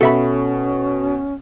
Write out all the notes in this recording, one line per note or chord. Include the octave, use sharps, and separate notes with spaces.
B2 C#4 A4 E5 B5